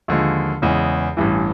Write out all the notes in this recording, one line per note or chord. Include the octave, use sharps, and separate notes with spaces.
D#2 D3 F3 G#3
E2 C#3 E3 G#3
A1 G2 E3